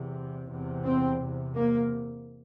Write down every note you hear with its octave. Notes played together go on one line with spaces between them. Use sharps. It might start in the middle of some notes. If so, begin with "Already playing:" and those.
Already playing: E2 C3
E2 C3
C4
E2 C3
A#3